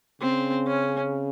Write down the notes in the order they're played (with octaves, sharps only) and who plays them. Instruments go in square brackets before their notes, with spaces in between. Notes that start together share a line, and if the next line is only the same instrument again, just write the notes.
[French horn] C#3 [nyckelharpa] C4
[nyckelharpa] C#4